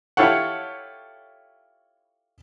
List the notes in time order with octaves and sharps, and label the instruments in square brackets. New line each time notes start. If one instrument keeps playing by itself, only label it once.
[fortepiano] E4 F4 G4 A4 C#5 F#5